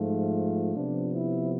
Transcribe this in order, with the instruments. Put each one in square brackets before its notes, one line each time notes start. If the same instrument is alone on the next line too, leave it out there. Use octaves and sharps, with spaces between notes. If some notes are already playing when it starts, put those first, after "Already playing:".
Already playing: [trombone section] G#2 F3 A3 F4
C3 F3 B3 D4
E4